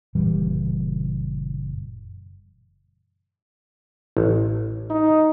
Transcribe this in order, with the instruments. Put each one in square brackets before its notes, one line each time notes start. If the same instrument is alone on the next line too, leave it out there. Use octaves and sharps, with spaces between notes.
[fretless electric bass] F#1 A#2 E3 G3
[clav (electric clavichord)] A1
[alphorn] D#4